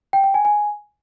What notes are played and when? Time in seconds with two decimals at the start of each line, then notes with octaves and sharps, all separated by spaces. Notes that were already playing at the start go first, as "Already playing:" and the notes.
0.13 G5
0.24 G5
0.34 G#5
0.45 G#5